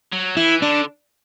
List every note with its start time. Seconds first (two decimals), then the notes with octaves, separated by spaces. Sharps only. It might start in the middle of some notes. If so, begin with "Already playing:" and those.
0.12 F#3
0.37 E3 E4
0.62 D3 D4